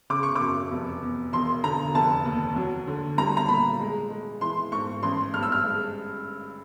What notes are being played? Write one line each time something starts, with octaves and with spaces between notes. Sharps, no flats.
C#3 D6
C#6
D6
F#2
F1
E2
E1 C6
D3 A#5
F1 A5
D#2
F#3
D3
G3 A#5
A#5
A#2 B5
G#3
G#3
E3 C6
G#2 C#6
A1 C6
G2 F6
E6
F6
G#3